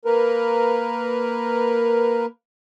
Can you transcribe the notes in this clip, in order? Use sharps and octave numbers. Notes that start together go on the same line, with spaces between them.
A#3 A#4 B4